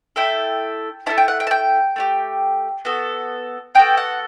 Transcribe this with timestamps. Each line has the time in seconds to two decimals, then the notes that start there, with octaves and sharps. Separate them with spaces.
0.16 A3 E4 A4 G5
1.06 A3 C#4 E4 A5
1.18 G5
1.28 F#5
1.40 G5
1.47 A5
1.51 G5
1.96 A3 E4 G4
2.85 B3 F#4 A4
3.75 B3 F#4 A4 G5
3.97 F#5